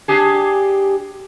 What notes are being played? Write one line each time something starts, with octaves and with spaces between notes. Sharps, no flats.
D4 G4 G#4